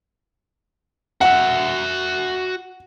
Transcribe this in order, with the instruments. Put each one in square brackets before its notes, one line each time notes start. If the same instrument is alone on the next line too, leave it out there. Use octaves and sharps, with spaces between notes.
[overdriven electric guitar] F#4 E5 [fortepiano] F#5